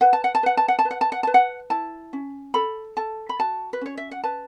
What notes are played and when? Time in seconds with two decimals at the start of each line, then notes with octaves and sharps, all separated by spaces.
0.01 B4 F#5
0.13 A5
0.24 F#5
0.35 A5
0.43 B4 F#5
0.57 A5
0.68 F#5
0.79 A5
0.85 B4
0.91 F#5
1.01 A5
1.12 F#5
1.23 B4 A5
1.34 F#5
1.70 E4 A5
2.13 C#4
2.54 A4 B5
2.97 A4 A5
3.29 B5
3.39 F#4 A5
3.73 B4
3.81 C#4 C#5
3.97 E5
4.11 F#5
4.24 B4 A5